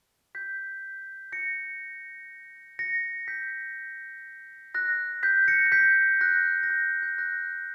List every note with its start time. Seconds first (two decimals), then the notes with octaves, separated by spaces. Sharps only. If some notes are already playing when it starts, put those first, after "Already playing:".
0.35 G6 B6
1.32 A#6 C#7
2.79 A#6 C#7
3.28 G6 B6
4.75 F#6 A#6
5.23 G6 B6
5.48 A#6 C#7
5.66 A#6
5.72 G6 B6
6.21 F#6 A#6
6.63 A#6
6.70 G6
7.03 G6
7.18 F#6 A#6